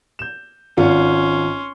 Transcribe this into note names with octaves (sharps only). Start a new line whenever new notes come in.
G6 E7
G#1 C#4 F4 C6